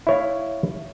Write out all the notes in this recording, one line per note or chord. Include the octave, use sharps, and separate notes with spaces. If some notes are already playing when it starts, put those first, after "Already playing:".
E4 C#5 F5